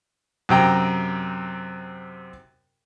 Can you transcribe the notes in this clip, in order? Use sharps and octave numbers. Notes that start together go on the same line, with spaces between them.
F#2 C3 G5 A#5